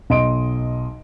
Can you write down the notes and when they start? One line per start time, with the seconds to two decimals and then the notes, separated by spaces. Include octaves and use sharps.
0.10 B1 D#5 C6 D7